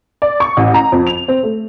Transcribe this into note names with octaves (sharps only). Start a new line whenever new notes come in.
D5
C#6
A1
A#5
F2
F7
C4
A3